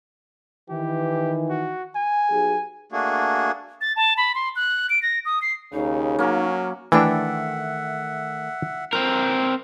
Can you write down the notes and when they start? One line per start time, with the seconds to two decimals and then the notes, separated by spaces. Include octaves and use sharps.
0.69 D#3 E3 G4
1.50 F#4
1.95 G#5
2.30 B1 G4 G#4
2.92 A3 A#3 D4 F#4 G#4
3.81 A6
3.96 A5
4.17 B5
4.35 C6
4.56 F#6
4.90 D7
5.02 A#6
5.25 D#6
5.42 C7
5.73 D#2 C#3 D#4
6.19 F#3 A#3 C#4
6.92 D#3 E3 A3 D4 E5 F#5 G5
8.93 C4 F4 A#4